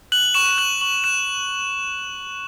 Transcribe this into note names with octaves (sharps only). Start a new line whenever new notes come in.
F#6 F#7
C#6 E7
F#6 F#7
C#6 F#7
F#6 E7